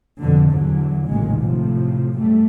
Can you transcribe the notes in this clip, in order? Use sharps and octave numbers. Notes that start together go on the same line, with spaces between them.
F2 B2 D3
E2 D3 F#3
A1 D#2 A#2 C#3 G#3
A2 C3 F3
F#2 G3 A3